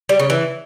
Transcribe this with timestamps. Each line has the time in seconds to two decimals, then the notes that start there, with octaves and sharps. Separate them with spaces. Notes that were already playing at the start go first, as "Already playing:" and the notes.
0.09 G3
0.20 C#3
0.30 E3